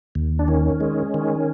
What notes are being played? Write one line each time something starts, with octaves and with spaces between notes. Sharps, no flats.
D#2
D4
D#3 C#4
G#3
D#3